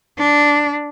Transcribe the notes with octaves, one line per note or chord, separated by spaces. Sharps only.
D4